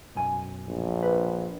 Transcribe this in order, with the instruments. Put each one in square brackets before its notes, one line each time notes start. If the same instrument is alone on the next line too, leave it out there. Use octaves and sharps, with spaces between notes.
[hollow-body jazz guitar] B1 F#2 G#5
[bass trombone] A#1
[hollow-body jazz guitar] B4